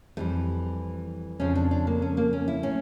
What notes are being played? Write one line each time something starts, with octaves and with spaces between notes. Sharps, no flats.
F2 E3 G3 A3
F2 C#3 F3 C#4
D4
D4
A#3
C#4
A#3
C#4
E4
A2 C#4